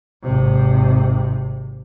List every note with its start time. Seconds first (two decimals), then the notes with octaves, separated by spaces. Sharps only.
0.23 G#1 C3